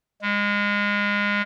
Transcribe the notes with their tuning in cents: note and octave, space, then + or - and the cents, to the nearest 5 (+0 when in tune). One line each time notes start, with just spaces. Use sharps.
G#3 -25